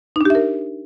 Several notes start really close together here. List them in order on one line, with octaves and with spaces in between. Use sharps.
D#4 D4 G4 E5 A#4